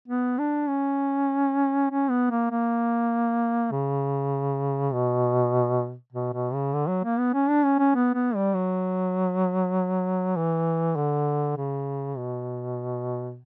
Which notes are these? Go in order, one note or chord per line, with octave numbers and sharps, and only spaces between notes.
B3
D4
C#4
C#4
B3
A#3
A#3
C#3
B2
B2
B2
C#3
D3
F#3
A#3
B3
C#4
D4
C#4
C#4
B3
B3
G3
F#3
E3
D3
C#3
B2